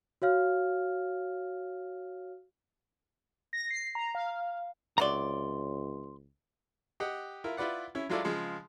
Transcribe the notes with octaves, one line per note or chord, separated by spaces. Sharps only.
F#4 C#5 F5 F6
A#6
C7
A#5
F5
C#2 C3 F#3 D5 A#5 C6
G4 D#5 F#5
E4 F4 A#4
E4 F4 B4 D5 F#5
C#4 E4
F#3 G#3 E4 F4 A4 D5
C#3 F3 G#3